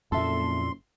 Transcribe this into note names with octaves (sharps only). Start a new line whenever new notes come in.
F#1 F2 A#2 A4 E5 C6